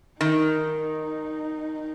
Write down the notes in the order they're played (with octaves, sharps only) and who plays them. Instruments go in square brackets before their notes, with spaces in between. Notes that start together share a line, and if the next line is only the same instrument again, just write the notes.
[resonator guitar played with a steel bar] D#3 [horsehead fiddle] D#4